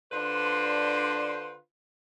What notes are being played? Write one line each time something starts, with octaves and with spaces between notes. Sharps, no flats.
D3 D4 F4 B4 C5